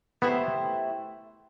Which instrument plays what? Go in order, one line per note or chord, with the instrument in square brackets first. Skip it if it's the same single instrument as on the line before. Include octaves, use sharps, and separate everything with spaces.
[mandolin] A3 E4 G4 C5 [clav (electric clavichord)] B3